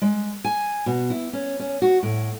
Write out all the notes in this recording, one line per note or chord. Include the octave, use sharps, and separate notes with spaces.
G#3
G#5
B2
E4
C#4
C#4
F#4
A2